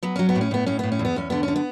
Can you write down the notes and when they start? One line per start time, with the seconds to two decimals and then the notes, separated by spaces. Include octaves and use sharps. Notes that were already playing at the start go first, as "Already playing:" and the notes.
0.03 F#3 B3
0.16 F#3 C#4
0.29 B3
0.35 A2
0.41 C#4
0.51 A2 B3
0.66 A2 C#4
0.79 A2 B3
0.92 C#4
0.99 E2
1.05 B3
1.16 E2 C#4
1.30 D3 B3
1.43 D3 C#4
1.56 B3